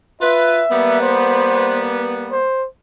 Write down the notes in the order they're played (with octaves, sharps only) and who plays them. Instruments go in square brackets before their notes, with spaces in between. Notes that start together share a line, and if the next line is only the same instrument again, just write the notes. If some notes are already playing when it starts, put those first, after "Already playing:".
[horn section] F4 B4 [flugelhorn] E5
[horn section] G3 A#3 B3
[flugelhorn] C5
C5